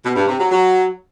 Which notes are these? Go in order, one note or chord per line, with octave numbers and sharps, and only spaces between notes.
B2
G2
C3
F#3
F#3